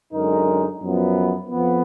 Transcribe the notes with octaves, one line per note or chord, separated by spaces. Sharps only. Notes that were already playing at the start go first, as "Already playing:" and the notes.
F#2 D3 G#3 D#4 A#4
F#2 F3 B3
F2 F3 B3